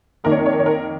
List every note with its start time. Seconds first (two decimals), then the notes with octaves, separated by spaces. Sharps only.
0.24 F2 D#3 A#3 A#4
0.31 C#5
0.39 A#4
0.46 C#5
0.53 A#4
0.59 C#5
0.66 A#4